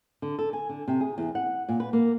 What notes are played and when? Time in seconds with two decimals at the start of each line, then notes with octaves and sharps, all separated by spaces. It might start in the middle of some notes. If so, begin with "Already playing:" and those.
0.22 D3
0.39 A4
0.53 G#5
0.69 D3
0.88 C3
1.01 G#4
1.18 E2
1.35 F#5
1.69 A#2
1.80 B4
1.93 A#3